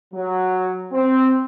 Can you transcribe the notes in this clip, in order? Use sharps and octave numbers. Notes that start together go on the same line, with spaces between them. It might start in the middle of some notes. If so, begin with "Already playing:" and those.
F#3
C4